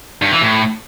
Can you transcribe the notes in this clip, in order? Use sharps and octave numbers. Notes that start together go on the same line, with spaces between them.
G2
E3
A2